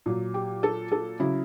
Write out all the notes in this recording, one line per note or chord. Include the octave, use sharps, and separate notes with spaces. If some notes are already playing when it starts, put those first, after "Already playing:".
A#2 F#3
G4
A4
A4
C#3 F#3 E4